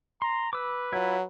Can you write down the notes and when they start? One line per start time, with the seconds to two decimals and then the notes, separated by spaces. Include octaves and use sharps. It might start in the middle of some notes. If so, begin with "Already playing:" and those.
0.22 A#5 C6
0.53 B4 D6 E6
0.93 F#3 E4 F4